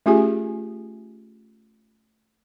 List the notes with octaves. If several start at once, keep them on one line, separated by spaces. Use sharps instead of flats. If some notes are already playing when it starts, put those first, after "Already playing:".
A3 C#4 F4 G4 G#4 G#5